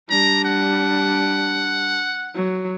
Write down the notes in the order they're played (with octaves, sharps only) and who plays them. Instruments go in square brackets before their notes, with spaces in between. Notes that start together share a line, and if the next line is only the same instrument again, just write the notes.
[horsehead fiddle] G3 D4 [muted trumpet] A#5
[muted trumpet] F#5
[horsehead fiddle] F#3